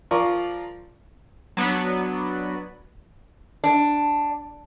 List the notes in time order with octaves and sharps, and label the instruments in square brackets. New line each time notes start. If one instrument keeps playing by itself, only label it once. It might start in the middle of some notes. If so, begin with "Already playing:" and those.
[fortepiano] F3 F4 A#4 D5 C#6
[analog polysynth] F#3 B3 D4 B4
[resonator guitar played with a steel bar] D4